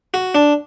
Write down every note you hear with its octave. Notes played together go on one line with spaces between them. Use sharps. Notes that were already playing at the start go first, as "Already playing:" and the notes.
F#4
D4